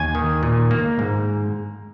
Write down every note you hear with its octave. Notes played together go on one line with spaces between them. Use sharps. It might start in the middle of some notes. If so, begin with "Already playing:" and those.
Already playing: D#2 G#5
D#3
A#2
A#3
G#2